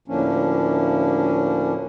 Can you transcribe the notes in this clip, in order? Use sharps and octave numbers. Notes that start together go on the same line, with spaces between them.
D2 A2 F3 A#3 C#4 D4